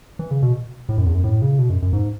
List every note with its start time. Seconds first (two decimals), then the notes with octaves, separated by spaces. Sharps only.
0.19 E3
0.31 C#3
0.42 B2
0.89 A2
0.98 F#2
1.06 E2
1.15 F#2
1.24 A2
1.42 C#3
1.59 B2
1.70 F#2
1.82 F#2
1.93 G#2